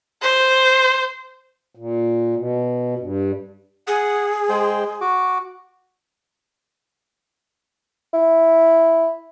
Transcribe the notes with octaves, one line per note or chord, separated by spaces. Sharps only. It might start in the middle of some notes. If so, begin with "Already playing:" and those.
C5
A#2
B2
G2
G#4 F#5
G#3 C5 G5
F#4 D6
E4